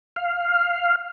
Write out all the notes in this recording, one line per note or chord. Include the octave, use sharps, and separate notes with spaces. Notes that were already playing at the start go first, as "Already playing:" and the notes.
F5